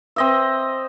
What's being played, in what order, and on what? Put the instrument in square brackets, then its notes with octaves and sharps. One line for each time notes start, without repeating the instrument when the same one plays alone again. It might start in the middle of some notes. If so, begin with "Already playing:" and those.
[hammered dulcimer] C4 D#5 E5